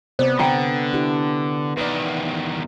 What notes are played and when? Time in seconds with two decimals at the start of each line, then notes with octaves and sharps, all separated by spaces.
0.19 C3 B3 C4 C5 D5
0.39 D3 F#5 G5 A#5
0.93 D4 E4 G4
1.77 E2 D#3 B4 D5